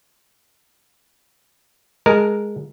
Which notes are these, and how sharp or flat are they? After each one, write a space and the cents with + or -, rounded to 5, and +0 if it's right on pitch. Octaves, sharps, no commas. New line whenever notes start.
G#3 +0 A#4 +0 A5 +0